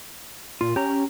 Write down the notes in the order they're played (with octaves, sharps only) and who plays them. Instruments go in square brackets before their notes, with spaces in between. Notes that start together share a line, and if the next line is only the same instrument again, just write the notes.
[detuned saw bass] A#2 [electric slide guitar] F4
[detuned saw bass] C#4 [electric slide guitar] G4 A#5